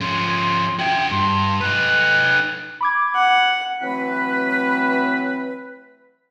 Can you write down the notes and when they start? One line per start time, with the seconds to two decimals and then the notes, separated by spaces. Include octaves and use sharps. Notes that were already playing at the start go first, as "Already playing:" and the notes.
0.01 F3 C#4 C6
0.79 F#4 E5 G5
1.11 G2 C6
1.61 D#4 B4 F#6
2.81 B5 D6 G#6
3.15 F#5
3.82 E3 F#3 A3 C4 B4